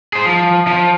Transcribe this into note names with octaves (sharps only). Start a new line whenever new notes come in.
G#4 C5
F3
F3